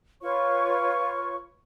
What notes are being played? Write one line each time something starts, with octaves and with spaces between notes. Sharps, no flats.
F4 B4 C#5 C#6